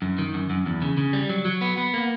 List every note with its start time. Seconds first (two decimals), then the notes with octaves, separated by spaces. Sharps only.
0.02 F#2
0.18 D#3
0.34 F#2
0.50 F#2
0.66 E2
0.82 C#3
0.97 C#3
1.13 G3
1.29 F#3
1.45 F#3
1.61 B3
1.77 B3
1.94 A#3